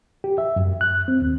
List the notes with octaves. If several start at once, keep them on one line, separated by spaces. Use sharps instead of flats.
G4
E5
F#2
F#6
C4
D#2